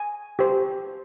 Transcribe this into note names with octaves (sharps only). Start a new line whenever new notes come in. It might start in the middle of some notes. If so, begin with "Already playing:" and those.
Already playing: G#5
G4 C5